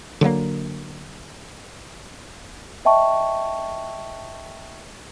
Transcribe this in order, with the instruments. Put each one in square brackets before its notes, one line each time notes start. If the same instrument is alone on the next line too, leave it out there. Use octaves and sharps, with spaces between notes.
[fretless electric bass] D3 F#3 G#3 A#3
[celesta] D#5 E5 G5 A5 C#6